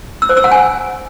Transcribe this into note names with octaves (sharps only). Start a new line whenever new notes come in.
E6
C5
E6
F#5
G#5